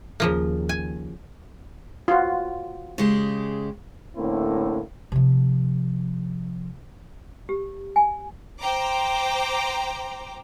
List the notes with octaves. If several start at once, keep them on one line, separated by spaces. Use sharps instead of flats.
D#2 C#3 F3 A#3
G#5
F4 F#4
C#3 G#3 G4
A2 D3 A#3 C4 C#4 E4
C3 F3
G4
G#5
C5 G5 A#5 D6